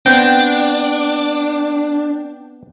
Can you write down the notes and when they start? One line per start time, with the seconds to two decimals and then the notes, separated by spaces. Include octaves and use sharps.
0.06 B3 C4 D4 G5